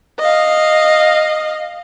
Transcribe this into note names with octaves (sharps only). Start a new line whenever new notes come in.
D#5 F5